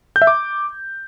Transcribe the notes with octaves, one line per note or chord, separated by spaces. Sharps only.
G6
E5
D6